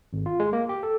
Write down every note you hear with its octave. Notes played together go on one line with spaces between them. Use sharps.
G#1
F4
G#3
A#3
G4
A4